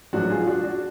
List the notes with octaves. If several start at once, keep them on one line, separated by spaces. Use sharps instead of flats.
A1 G#2 F#3 D4 F#4
F4 G#4
D4 F#4
D4 F#4